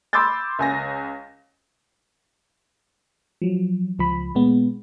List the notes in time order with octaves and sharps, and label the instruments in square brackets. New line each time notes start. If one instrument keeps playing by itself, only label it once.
[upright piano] B5 C6 D6 E6 G6 A6
C#2 G#5 A#6
[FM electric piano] F3 F#3
C#2 F3 B5
A#2 G#3 B3